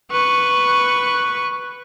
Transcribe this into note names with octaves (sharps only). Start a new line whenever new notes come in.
B4 C#6